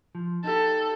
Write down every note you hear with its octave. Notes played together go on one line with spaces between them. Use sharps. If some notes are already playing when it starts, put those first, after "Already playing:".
F3
D#4 G4 A4